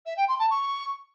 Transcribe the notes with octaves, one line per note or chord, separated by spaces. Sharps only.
E5
G5
C6
A5
C#6